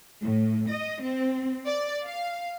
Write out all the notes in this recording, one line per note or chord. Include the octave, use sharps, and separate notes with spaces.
A2
D#5
C4
D5
F5